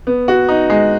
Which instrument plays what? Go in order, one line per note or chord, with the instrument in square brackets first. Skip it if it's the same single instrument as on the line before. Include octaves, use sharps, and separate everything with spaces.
[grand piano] B3
F#4
D#4
G#3